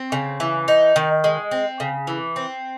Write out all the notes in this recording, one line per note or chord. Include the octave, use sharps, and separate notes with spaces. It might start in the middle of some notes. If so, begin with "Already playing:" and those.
Already playing: C4
C#3
E3
D#4
D#3
G#3
C4
C#3
E3
C4